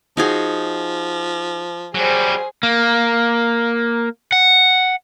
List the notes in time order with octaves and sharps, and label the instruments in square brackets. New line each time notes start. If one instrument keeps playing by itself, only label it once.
[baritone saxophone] F3 [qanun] D#4 F#4 G#4
[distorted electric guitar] F#3 G3 [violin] G#4 C5
[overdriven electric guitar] A#3
F#5